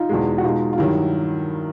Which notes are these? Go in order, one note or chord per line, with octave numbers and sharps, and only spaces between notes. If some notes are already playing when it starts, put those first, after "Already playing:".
Already playing: D#4 F4
E2 B2 G#3
F#4
B2 G#3 D#4 F4
F4
G2 D#3 F#3 E4